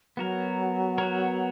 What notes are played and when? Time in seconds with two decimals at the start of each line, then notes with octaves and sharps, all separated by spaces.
0.17 F#3 B3 F#4 A#4 C#5
0.98 B3 F#4 A#4 C#5